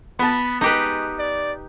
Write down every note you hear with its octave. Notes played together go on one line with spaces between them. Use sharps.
B3 A5 B5
G#3 D#4 G4 B4
D5